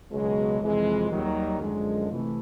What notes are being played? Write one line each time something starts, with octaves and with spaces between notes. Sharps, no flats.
C#2 B2 F#3 G#3
F2 C3 E3 G#3
D#2 D#3 F#3 G3
F#2 D3 F3 G#3
C3 E3 A3